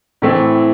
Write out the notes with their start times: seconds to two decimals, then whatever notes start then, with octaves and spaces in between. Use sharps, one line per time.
0.22 A2 E3 A3 C4